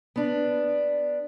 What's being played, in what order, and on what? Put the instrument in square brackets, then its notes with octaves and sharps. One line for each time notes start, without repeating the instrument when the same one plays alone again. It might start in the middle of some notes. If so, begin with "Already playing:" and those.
[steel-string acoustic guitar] B3 D4